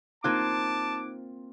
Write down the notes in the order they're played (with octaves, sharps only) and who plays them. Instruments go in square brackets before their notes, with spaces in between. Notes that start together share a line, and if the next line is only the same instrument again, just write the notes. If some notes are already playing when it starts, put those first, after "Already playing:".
[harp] A#3 C4 F4 [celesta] D#4 F#6 G#6 [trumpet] A5 [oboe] D6